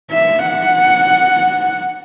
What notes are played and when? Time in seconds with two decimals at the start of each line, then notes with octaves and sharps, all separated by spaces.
0.11 E5
0.46 F#5